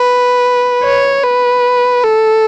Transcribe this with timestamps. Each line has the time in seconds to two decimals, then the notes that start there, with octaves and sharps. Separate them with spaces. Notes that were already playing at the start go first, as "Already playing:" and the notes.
Already playing: B4
0.84 C#5
1.24 B4
2.04 A4